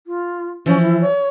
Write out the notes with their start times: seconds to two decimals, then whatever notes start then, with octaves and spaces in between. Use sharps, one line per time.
0.07 F4
0.66 E3 F3 C#4
0.82 E4
1.01 C#5